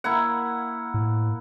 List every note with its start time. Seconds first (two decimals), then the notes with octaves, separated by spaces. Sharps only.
0.04 A#3 E4 F#5
0.94 A2